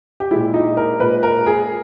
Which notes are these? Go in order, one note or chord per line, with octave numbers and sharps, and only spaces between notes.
G4
A#2 G#3 E4
D#4
A#4
A#2 G#3 B4
A#4
G#4